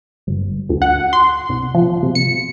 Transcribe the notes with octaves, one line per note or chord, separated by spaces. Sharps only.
G1
D2
F#5
C6
C2
F3
C3
C#7